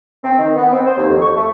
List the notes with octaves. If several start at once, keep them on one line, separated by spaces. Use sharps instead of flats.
C4
D#3
B3
C4
C5
D#2
F2
C#6
A3